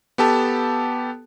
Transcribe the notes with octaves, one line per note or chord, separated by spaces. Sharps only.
B3 G4 A4 A5